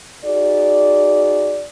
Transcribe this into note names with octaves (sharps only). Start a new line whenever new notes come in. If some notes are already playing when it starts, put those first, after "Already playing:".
D#4 F#4 G#4 D5